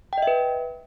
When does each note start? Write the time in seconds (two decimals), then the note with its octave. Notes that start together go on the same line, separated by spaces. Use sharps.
0.13 G5
0.18 D#5
0.22 E5
0.27 B4